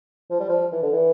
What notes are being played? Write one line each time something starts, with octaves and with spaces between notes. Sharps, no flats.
F3
G3
F3
E3
D3
E3